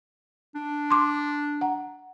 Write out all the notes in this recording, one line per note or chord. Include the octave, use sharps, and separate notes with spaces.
D4
C6 D6
F#5 A#5